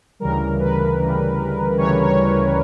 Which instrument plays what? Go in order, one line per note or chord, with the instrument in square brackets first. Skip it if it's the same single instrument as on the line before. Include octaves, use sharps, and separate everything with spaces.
[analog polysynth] D2 C#3 E3 G3 A#4
B4
D2 C#3 E3 G3
D2 C#3 E3 G3 C#5
C#5